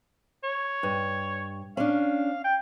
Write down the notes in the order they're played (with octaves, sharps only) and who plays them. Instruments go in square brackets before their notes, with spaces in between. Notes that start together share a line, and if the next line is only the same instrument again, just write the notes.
[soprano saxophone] C#5
[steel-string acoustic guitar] G2
[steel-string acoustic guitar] C#4 D4 [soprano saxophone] F5
[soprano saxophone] G5